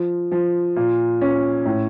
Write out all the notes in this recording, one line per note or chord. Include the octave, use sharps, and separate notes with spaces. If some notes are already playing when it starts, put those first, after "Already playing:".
Already playing: F3
F3
A#2
C#4
A2